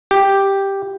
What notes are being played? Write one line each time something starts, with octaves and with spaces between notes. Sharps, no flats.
G4